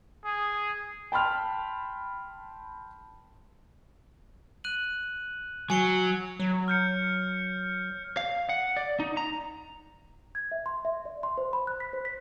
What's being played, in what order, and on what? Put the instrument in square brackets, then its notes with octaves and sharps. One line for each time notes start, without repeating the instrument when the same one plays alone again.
[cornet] G#4
[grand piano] G5 A5 B5 C6 F6
[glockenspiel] F#6 D#7 F#7
[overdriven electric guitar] F#3 [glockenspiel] G#5 C#7 G7
[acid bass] F#3
[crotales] F6 G6 C#7
[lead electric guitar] F5
F#5
D5
D#4
A#5
[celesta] G#6
E5
C6
E5
D5
C6
C5
B5
F#6
B6
C5
B6